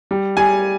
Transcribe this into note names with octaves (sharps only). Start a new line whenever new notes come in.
G3
G3 G#5